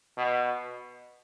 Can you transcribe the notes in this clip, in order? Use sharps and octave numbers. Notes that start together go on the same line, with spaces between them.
B2